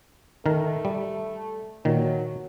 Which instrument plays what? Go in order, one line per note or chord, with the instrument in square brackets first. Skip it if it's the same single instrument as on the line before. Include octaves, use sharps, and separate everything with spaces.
[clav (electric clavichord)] D#3 A#4 [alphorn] A3
[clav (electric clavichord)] G3
[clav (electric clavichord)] A#2 D#3 [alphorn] F#3